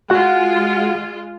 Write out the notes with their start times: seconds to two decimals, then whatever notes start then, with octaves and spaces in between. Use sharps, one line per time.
0.10 G#3 F4 F#4 F#5